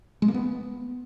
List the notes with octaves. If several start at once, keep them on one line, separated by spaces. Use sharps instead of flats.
G#3
A#3
B3